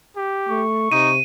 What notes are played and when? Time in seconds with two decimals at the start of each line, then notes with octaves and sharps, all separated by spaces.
0.16 G4
0.49 A3 C#6
0.92 C3 D#4 D#7